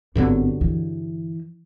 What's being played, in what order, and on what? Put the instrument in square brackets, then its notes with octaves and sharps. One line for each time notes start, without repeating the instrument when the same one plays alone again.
[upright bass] G#1 B3 [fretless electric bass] G2 D3 F#3
[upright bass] E3